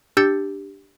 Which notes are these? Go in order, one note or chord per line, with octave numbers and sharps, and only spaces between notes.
D4 G4 E6 G6 A6 C#7